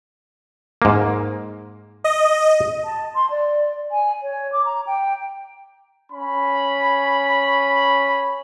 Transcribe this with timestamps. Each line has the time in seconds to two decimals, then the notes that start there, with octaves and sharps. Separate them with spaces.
0.82 G#2 A#3
2.04 D#5
2.85 A5
3.15 C6
3.30 D5
3.91 G#5
4.23 C#5
4.52 D6
4.65 A#5
4.87 G5
6.11 C#4 B5